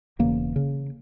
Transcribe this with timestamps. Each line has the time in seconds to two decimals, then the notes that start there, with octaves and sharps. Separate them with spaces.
0.19 E1 E2 C#3 A#3
0.56 C#3